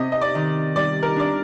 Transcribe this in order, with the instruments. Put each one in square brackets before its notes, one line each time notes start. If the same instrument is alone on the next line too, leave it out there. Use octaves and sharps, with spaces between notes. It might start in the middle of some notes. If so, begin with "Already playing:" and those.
Already playing: [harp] C3 [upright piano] D#5
[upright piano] D#5
D5
[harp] D#3
[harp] G3 [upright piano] D5
[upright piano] A#4
[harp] D4 [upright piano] D5